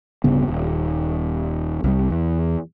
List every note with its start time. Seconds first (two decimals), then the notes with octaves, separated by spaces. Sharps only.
0.24 D1 G2 C#3 B3
0.48 D#1
1.84 C2 F#3 G3
2.10 E2